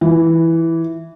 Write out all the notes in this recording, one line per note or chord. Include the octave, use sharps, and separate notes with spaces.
E3